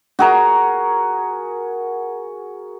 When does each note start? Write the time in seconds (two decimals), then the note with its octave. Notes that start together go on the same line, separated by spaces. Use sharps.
0.19 F#4 G#4 A#4